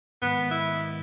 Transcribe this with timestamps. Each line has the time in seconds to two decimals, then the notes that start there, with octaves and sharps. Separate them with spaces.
0.22 G#2 D#3 G#3 B3
0.51 E4